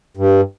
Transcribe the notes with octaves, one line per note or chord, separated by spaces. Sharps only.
G2